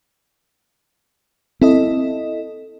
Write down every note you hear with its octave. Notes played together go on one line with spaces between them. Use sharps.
C4 E4 A4 D#5